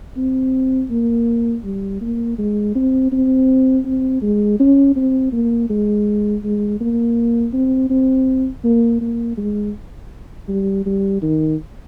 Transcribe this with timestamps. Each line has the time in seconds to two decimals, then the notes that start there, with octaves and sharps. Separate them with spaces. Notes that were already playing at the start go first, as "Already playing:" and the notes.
0.17 C4
0.90 A#3
1.64 G3
2.01 A#3
2.38 G#3
2.75 C4
3.12 C4
3.85 C4
4.22 G#3
4.60 C#4
4.96 C4
5.32 A#3
5.70 G#3
6.44 G#3
6.80 A#3
7.53 C4
7.90 C4
8.64 A#3
9.01 A#3
9.37 G#3
10.48 G3
10.85 G3
11.22 D#3